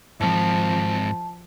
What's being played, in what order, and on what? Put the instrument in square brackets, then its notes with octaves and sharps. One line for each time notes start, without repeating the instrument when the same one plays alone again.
[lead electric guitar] G#2 C4 [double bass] F3 [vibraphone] A5